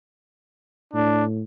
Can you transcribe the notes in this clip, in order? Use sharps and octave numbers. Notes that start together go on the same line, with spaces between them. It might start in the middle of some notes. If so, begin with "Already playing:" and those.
A2 D4